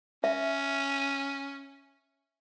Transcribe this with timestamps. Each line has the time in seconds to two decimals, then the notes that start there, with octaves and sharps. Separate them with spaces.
0.24 C#4 E5